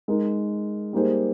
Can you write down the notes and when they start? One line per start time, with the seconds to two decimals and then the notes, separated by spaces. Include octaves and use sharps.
0.08 G#3 D#4 A#4
0.93 G3 A#3 D#4 G#4 C5